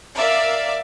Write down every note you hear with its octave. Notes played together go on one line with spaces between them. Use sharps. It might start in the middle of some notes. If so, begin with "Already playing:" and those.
A#4 D5 E5 F5